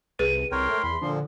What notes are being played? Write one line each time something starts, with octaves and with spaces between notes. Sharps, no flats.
C2 G#4 B4 D#7
C2 A#4 C#5 G5 C6
A3
E2 B5
A#2 D3 F3